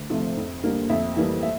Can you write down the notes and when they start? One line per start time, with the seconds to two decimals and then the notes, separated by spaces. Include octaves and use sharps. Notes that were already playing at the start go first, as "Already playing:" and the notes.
Already playing: D2
0.10 C3 F3 A3
0.37 F2
0.64 D3 G3 A#3
0.89 F2 E5
1.16 E3 G3 A#3
1.43 E5